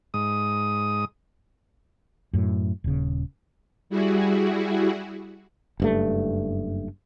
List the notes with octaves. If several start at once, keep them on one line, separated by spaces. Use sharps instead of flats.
G#2 D#6
F#2 A2
D#1 C#3
G3 E4 F#4 G#4
F#1 G2 A3